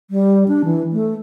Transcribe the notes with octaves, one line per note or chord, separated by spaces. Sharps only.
G3
D4
E3
A3